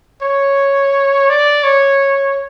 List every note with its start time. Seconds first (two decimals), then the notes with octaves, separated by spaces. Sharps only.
0.22 C#5
1.29 D5
1.64 C#5